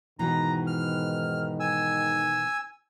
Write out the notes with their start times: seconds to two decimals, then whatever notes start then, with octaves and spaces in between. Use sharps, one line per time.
0.19 G#2 B2 D#3 E3 A#5
0.67 F6
1.60 G#5 E6